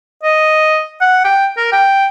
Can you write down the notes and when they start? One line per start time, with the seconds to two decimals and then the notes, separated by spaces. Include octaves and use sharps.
0.23 D#5
1.01 F#5
1.24 G5
1.57 A#4
1.72 G5